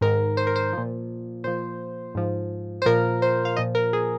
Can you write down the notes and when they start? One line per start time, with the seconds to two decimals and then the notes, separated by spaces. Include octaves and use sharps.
0.01 G#2 D#3 A#4
0.37 C5
0.47 A#4
0.56 C5
0.73 A#2 F3
1.44 A#2 F3 C5
2.15 G#2 F3
2.82 C5
2.86 A#2 F3 A#4
3.22 C5
3.45 F5
3.56 A#2 F3 D#5
3.75 A#4
3.93 G#4